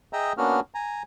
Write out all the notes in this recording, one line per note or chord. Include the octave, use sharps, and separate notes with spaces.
G#4 D#5 E5 G5 A#5 E6
A#3 B3 C#4 D4 F#4 F6
G#5 A#5